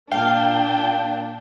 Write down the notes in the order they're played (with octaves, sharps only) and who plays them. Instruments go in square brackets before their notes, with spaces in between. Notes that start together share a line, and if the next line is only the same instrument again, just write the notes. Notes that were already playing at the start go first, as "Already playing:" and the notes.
[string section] A#2 A#3 D4 [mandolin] F5 [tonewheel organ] G5